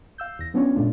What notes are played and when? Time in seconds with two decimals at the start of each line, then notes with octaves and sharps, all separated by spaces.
0.18 F5 E6 G6
0.39 E2 A#6
0.54 F#3 B3 C#4 D4 F4 C#5
0.76 G2 A#2 G#3 A3 D4 F4